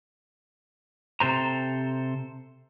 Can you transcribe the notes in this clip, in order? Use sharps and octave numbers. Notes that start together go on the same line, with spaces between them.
C3 A4 C5 A#5